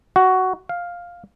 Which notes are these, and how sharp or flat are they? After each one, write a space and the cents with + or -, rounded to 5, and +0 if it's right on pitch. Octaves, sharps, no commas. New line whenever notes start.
F#4 +10
F5 +5